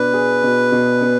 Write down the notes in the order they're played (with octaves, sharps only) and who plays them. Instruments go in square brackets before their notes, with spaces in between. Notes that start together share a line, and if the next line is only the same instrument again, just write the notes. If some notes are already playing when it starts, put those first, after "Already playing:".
Already playing: [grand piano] B2 D4 [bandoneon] B4
[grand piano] G#4
B2
B2
B3